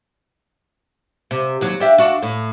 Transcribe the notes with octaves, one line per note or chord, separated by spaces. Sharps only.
C3
D#2 F#3
D4 G4 E5
D4 F#4
A2